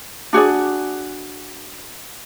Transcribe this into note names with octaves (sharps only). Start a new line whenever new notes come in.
D4 F#4 G#4 D5